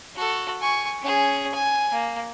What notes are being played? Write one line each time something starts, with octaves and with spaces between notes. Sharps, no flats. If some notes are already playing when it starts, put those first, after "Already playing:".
F#4 A4
G#5 C#6
C#4 G#4
G#5
A#3